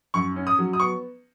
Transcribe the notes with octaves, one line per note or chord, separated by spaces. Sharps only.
F#2 C#6
C#4
D#6
F#3
D#6
B3 C#6